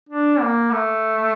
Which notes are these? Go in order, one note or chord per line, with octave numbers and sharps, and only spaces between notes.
D4
A#3
A3